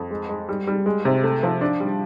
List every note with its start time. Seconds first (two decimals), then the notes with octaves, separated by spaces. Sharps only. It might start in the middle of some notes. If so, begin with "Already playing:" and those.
Already playing: F2
0.11 G#3
0.29 G#3
0.49 G3
0.67 G3
0.86 G#3
1.05 C3
1.24 A3
1.43 F3
1.61 D4
1.80 G3